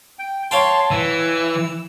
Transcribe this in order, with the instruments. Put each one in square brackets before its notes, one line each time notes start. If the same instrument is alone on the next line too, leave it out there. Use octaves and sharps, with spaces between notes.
[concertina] G5
[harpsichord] C#5 F5 G5 [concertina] A5 C6
[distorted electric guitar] E3 [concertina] E6